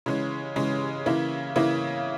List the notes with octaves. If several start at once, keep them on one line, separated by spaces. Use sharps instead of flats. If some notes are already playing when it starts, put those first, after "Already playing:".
C#3 E3 G#3 C#4
C#3 E3 G#3 C#4
C#3 E3 A#3 E4
C#3 E3 A#3 E4